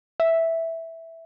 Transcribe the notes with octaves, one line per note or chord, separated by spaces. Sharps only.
E5